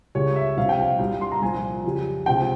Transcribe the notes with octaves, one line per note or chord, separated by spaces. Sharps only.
C#2 C#3 G3 C#5
E5
C2 C3 F3 F5
G5
F5
C2 A#2 G3
C6
A#5
C2 A#2 F3 G#5
F2 C#3 G3
C#2 C3 F3 G5